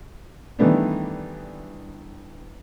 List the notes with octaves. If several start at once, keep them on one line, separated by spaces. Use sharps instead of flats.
D#3 E3 G3 A3 B3 D4